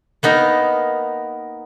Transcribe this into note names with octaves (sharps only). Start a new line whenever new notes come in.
A#3 B3 D#4 A#4